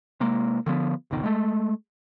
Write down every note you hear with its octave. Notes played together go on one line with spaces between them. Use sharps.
C3 G#3 A#3
D3 F3 B3
F#1 C#2 B2 D#3
G#3 A3